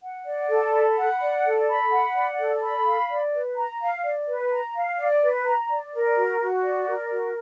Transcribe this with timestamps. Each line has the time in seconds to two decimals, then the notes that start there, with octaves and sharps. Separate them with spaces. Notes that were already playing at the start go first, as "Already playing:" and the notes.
0.02 F#5
0.26 D5
0.50 A4
0.73 B5
0.97 F#5
1.20 D5
1.44 A4
1.68 B5
1.92 F#5
2.15 D5
2.39 A4
2.63 B5
2.86 F5
3.10 D5
3.33 B4
3.57 A#5
3.81 F5
4.04 D5
4.28 B4
4.52 A#5
4.75 F5
4.98 D5
5.22 B4
5.46 A#5
5.69 D5
5.93 A#4
6.17 F#4
6.41 F#4
6.64 D5
6.88 A#4
7.11 F#4